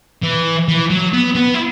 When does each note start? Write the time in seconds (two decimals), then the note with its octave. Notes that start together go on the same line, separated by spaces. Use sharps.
0.23 E3
0.68 E3
0.91 F#3
1.14 B3
1.36 B3
1.55 E4